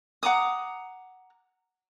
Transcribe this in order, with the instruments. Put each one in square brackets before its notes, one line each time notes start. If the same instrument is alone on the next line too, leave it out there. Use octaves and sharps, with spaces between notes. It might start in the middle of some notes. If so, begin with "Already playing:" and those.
[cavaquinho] F#5 A#5 D6 D#6